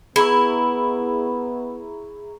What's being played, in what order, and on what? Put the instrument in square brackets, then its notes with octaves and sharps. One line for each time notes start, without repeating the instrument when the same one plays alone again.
[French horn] B3 [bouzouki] E4 [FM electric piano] G#4 A#5 C#6